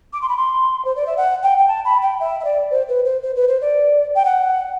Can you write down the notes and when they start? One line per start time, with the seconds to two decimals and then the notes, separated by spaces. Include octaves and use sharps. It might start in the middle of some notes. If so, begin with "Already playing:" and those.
0.13 D6
0.21 C6
0.28 B5
0.37 C6
0.84 C5
0.96 D5
1.06 E5
1.17 F#5
1.42 G5
1.57 G5
1.68 A5
1.85 B5
2.02 G5
2.20 E5
2.40 E5
2.44 D5
2.70 C5
2.88 B4
3.05 C5
3.22 C5
3.35 B4
3.48 C5
3.61 D5
4.15 G5
4.25 F#5